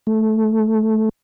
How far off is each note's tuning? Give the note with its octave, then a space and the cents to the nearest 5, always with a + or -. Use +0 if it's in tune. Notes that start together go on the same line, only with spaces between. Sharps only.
A3 -10